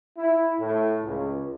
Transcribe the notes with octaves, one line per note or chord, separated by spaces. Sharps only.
E4
A2
C#2